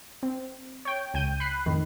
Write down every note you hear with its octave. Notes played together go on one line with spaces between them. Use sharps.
C4
C#5 G5
C#2 G5 G6 D#7
B5 F#6 C7
A1 F2 D#3